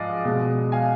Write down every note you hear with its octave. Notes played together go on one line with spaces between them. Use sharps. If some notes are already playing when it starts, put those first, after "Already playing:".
Already playing: G#2 F3 G#3 D5 D#5 F5
B2 G#3
F5 G#5